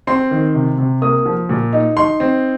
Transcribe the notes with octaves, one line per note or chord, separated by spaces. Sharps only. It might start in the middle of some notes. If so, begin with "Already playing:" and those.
C4 C6
D#3
C3
C3
A#3 D#6
F3
A#2
D#4
D#4 C6
C4